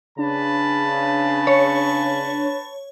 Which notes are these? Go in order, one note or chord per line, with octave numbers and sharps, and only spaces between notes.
C#3 D4 B4 A5 B5
C#5